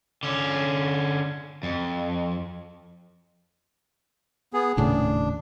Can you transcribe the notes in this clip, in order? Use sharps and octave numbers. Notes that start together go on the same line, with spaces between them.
D3 C#4
F2
B3 G#4
D#1 A2 C#3 D4